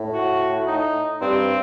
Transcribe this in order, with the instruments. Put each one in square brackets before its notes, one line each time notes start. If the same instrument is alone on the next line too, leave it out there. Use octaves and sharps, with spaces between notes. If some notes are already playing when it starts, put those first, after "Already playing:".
Already playing: [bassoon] A2
[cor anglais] F#4
D#4
[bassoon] G2 [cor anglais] C4